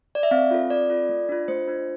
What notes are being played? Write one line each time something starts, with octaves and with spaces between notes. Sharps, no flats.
D5
E5
C4 F5
F4 A4
C4 D5
F4 A4
A3
D4 F4
A3 C5
D4 F4